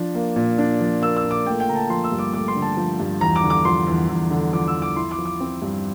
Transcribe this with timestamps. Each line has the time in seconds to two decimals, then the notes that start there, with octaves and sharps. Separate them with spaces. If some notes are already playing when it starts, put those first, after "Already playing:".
Already playing: F3 D4
0.15 A#3
0.36 A#2
0.58 D4
0.80 F3
1.02 A#3 E6
1.17 E6
1.24 A#2
1.31 D6
1.46 A3 G5
1.60 G5
1.68 D3 A#5
1.75 A5
1.90 F3 C6
2.04 E6
2.12 G2
2.19 D6
2.33 A3 D6
2.48 C6
2.56 D3
2.62 A5
2.77 F3
3.00 G2
3.21 E2 A#5
3.36 D6
3.43 D3
3.50 D6
3.65 F3 C6
3.87 E2
4.09 E2
4.30 D3
4.53 F3 D6
4.68 E6
4.74 E2
4.82 D6
4.96 E4 C6
5.11 D6
5.18 F3
5.25 D6
5.40 C4
5.62 G2